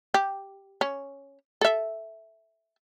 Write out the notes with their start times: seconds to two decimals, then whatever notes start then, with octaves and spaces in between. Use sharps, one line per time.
0.14 G4
0.81 C#4
1.61 A4 E5